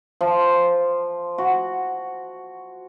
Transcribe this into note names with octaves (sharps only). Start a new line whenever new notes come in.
F3
F#4